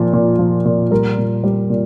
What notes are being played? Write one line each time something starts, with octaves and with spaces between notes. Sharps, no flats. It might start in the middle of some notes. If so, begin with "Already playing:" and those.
Already playing: A#2 F3
A#2
F3
A#2
G3 A#4
A#2
G3
A#2